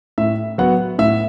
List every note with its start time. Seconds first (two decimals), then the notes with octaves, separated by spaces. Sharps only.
0.18 A2 E5
0.58 F#3 B3 F#5
0.99 A2 E5